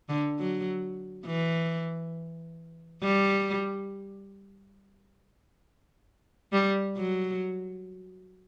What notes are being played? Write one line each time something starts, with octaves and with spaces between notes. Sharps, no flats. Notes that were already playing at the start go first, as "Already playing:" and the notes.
D3
F#3
E3
G3
G3
F#3